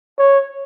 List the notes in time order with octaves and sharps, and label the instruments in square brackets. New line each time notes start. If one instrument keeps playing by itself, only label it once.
[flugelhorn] C#5